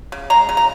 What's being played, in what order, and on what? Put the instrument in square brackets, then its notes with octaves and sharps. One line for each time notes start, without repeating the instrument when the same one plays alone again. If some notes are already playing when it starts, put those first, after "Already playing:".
[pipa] C#3
G#3 A#5
C#3
A#5